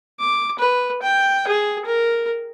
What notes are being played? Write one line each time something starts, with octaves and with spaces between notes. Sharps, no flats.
D6
B4
G5
G#4
A#4